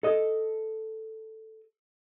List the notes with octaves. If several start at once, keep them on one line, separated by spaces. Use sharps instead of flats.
A4 D#5